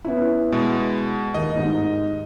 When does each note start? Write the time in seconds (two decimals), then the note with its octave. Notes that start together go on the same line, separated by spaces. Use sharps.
0.05 B3 C#4 E4
0.52 B2 G#3
1.34 D#2 D#5
1.56 G#2 D#4